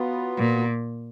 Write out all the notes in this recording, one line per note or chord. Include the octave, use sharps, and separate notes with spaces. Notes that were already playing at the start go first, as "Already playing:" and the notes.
Already playing: F#3 B3 F4
A#2